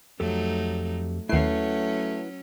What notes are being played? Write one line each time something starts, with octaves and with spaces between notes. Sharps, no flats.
F2 F#3 A3 D#4 G4 A4
D#2 F#3 A3 C#4 E4 B4 F#5 C7